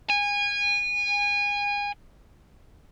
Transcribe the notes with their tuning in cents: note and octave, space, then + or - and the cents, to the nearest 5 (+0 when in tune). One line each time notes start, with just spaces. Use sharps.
G#5 -25